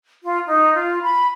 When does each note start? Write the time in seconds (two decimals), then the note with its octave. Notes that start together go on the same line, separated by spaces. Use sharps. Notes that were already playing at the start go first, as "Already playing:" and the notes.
0.23 F4
0.46 D#4
0.74 F4
1.01 B5